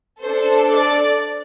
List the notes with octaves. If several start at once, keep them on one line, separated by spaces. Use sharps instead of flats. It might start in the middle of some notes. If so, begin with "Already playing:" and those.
D4 A4 C5
D5